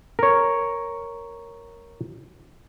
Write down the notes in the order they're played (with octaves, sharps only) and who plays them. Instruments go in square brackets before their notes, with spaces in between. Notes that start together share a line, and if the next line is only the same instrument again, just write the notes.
[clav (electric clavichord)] A#4 C#5